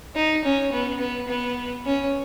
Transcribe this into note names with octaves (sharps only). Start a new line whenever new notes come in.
D#4
C#4
B3
B3
B3
C#4